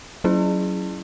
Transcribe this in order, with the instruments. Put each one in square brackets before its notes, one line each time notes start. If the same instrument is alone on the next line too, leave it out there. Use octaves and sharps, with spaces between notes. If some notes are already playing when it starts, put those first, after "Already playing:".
[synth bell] F#3 C#4 E4 G#4